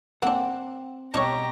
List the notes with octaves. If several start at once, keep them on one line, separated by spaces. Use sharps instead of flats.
A#3 C4 D4 F#5
B2 D4 D#4 G4 C#5 A#5